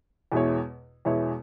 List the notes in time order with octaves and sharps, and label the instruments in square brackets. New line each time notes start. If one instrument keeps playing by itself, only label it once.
[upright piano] E2 B2 G#3 E4 C#5
E2 B2 G#3 E4 C#5